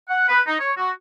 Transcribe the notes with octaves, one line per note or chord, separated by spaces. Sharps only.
F#5
B4
D#4
C#5
F#4